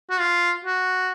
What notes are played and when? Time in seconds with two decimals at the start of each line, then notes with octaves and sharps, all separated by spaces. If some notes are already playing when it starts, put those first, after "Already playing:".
0.10 F#4
0.19 F4
0.65 F#4